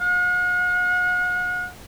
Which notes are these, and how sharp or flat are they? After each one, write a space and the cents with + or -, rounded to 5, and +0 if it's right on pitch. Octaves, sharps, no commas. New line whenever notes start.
F#5 -45